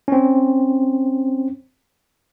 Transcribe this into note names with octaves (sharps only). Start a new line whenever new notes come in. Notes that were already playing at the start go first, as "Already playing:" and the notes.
C4 C#4